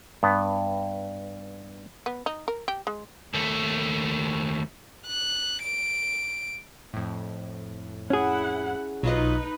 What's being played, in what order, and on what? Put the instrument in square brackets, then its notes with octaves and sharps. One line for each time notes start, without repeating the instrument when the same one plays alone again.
[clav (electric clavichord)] G2 B3
[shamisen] B3
D#4
A#4
G4
G#3
[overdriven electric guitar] D#2 A3
[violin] F#6
D7
[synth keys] F2 A2
[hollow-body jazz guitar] C#4 G#4 [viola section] E4 F#5
[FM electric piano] B1 [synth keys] F#3 F4 D#5 [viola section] D#4 B4